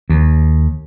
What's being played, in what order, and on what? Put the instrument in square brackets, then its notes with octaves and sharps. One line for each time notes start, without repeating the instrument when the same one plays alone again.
[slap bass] D#2